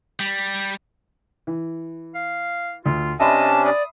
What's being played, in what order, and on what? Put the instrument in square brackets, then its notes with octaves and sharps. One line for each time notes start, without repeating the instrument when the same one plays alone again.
[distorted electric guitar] G3
[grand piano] E3
[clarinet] F5
[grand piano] D2 [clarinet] F4
[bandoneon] C3 C#4 D4 [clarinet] D#5 [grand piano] E5 B5 C6 [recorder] A5
[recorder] D5 [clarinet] D#6